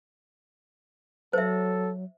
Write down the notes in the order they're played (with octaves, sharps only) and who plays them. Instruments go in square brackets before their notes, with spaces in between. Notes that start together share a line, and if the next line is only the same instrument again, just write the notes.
[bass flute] F#3 [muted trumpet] A4 [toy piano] C5 E5